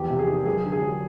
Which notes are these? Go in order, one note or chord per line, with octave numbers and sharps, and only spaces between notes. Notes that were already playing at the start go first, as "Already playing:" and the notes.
Already playing: E2 F3 G4
C3
G#4
D#3
F#2 G#4
D3
G#4
F#3